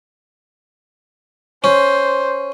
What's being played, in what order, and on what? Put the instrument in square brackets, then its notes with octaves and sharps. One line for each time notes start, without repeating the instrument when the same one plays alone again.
[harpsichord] C#4 [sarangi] C5